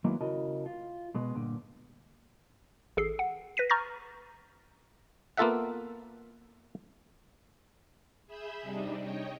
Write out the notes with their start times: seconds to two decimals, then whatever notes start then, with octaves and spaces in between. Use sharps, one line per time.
0.04 D#3 F#3 G#3 A#3 B3 E4
0.21 C#3 E4 F#4 A#4 D#5 A5
0.66 F4
1.14 B2 G#3 B3
1.35 G2 A#2 D3
2.97 A1 G#4 A4 C7
3.19 F#5
3.57 B4 A#6 B6 D#7
3.70 A#5 C#6 F6 G6 A6 A#6
5.37 A#3 B3 F4 A4 E5 F#5
8.26 G#4 E5 B5 E6 G6
8.62 C3 G3 D4 D#4
8.98 C#5 D#5 G5